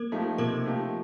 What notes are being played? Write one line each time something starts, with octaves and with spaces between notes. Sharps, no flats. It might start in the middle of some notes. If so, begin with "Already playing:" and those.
Already playing: A#3 A#4
F3 A3 D#4 G4
C3 A#3 A#4
F3 A3 D#4 G4